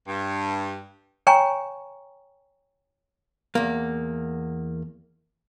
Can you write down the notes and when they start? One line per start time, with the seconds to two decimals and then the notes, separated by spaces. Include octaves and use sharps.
0.08 G2
1.27 C#5 G5 G#5 A#5 C#6
3.55 E2 A#3